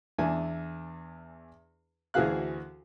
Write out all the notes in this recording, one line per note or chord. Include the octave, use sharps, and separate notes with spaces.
E2 D4 E4 G#5
D2 E3 F#4 G#4 F5 F#6